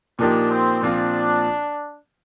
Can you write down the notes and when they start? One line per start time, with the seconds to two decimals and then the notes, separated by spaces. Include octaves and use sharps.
0.19 A#2 F3 A#3 D4 D#4 G4
0.51 C4
0.82 A#2 F3 C4 D4 F4